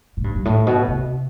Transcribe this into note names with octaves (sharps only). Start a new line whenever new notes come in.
A2
G2
G2
A2
B2
C3